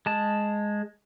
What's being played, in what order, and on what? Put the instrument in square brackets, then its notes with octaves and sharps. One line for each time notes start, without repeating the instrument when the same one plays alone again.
[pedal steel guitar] G#3 A5